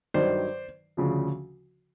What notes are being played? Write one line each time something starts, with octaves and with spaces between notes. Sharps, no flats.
G2 D#3 F#3 C5 D5
D2 C#3 F3